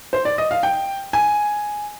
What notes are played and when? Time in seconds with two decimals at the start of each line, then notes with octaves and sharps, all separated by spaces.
0.13 C5
0.25 D5
0.38 D#5
0.51 F5
0.63 G5
1.13 G#5